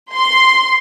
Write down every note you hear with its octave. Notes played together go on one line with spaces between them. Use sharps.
C6